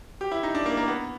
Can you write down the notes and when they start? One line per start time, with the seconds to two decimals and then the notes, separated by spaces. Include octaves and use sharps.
0.21 G4
0.32 E4
0.43 D#4
0.55 D4
0.66 A#3
0.77 A#3
0.88 B3